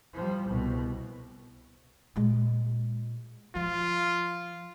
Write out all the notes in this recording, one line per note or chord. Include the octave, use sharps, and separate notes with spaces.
F3 G3
C2 B2
A#2 G#3
F3 F4